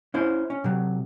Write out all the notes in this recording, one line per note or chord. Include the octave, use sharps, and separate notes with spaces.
C#4 E4 C5
C#4
C3 F#3